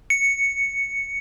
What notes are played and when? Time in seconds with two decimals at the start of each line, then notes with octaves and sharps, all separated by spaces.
0.10 C#7